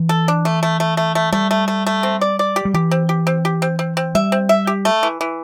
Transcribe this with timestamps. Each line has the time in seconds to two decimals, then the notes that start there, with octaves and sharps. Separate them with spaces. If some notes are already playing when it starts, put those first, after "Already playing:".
Already playing: E3
0.09 A4
0.28 D4
0.45 A3
0.63 A3
0.80 A3
0.97 A3
1.15 A3
1.33 G3 A3
1.51 A3
1.68 A3
1.86 A3
2.03 C4
2.21 D5
2.39 D5
2.56 G4
2.65 G3
2.74 E3 G4
2.91 C4
3.09 G4
3.27 C4
3.45 G4
3.62 C4
3.79 C4
3.97 C4
4.15 G3 E5
4.32 C4
4.49 E5
4.67 G4
4.85 A3
5.03 E3
5.21 E3